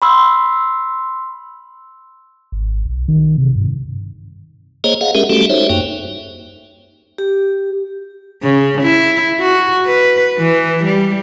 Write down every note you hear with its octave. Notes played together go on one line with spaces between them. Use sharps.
B5 C6 E6
G#1
B1
D#3
C3
G2
A#3 G#4 C5 C#5 D#5 A#5
G#4 D#5 F5 F#5
G#3 C#4 G4 G#4 A#4 E5
G3 A3 C#4 F#4 G4 A4
D#4 C5 C#5 E5
F#2 A#3 D#4 G5
G4
C#3
E4
F#4
B4
E3
G3